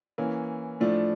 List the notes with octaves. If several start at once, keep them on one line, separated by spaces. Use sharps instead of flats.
E3 A#3 C#4
A2 F3 A3 D4